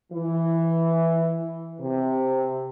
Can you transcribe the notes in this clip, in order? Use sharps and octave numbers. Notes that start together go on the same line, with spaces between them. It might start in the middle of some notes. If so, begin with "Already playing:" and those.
E3
C3